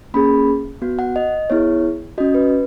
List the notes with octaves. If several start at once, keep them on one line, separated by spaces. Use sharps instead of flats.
A#3 C#4 G#4 B5
B3 F#4
F#5
D#5
B3 E4 G#4 C#5
C#4 F#4 D#5
B4